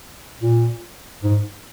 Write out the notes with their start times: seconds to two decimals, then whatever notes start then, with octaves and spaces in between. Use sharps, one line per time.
0.41 A#2
1.23 G#2